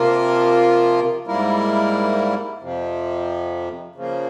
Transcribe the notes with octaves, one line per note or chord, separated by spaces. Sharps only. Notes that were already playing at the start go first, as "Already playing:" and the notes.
Already playing: C3 F3 A#3 F4 A#4
G#2 G3 A#3 E4 A#4
F2 C3 F3
C#3 F3 A#3